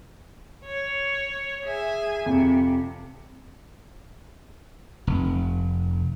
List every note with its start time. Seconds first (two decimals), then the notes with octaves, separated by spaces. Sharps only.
0.64 C#5
1.64 G#4 E5 G#5
2.26 F2 C3
5.07 F1